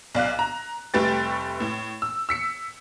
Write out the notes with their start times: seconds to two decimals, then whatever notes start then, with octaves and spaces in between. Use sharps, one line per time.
0.15 B1 D5 F5 F#6
0.39 A#5
0.94 F1 G3 A3 B4 G5 A6
1.60 A2
2.02 E6
2.29 E6 B6 C#7